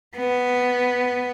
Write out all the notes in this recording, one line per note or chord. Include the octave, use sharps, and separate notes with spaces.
B3